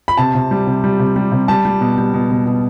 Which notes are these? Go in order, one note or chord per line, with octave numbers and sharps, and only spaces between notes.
B5
C3 A5
C3
G3
C3
G3
C3
G3
C3
G3 A5
G3
B2
G3
B2
B2
B2